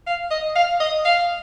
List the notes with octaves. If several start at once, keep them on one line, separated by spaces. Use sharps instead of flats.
F5
D#5
F5
D#5
F5